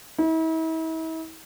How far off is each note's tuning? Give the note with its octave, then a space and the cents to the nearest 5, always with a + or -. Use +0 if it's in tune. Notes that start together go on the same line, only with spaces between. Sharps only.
E4 -40